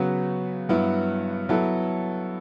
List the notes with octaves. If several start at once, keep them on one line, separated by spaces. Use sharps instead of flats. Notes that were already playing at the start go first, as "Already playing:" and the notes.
Already playing: C#3 F#3 B3 F#4
G2 F#3 B3 E4
F#3 B3 E4 A4